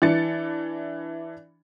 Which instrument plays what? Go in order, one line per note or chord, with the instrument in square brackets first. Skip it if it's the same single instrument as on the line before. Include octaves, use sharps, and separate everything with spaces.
[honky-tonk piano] E3 D4 A6 C#7